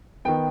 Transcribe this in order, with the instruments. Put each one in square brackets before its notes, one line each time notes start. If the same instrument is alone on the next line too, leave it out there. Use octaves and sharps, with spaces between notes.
[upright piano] D#3 B3 G5